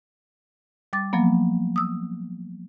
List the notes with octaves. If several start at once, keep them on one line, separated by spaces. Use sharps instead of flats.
G3 D6 A6
F3 F#3 A#3 B3
D#6 E6